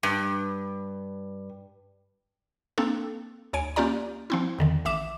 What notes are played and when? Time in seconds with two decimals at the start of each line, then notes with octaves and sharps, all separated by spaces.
0.03 G2
2.78 A#3 C4 D4 A4
3.53 D2 C#5 G#5 D7
3.76 A#3 C#4 F4 G4 D5 A#5
4.30 F3 C4 E4
4.59 E2 D3 D#3
4.85 A1 E5 D6 E7